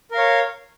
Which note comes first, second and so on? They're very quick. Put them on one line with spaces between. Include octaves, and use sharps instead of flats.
A#4 F5 C#5